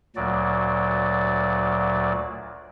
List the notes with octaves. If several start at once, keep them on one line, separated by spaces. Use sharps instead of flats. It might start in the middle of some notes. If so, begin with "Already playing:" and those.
D2 A#2 F#3 D5